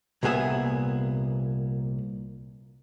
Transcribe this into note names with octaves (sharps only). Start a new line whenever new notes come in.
C2 A#2 B3 G#4 E5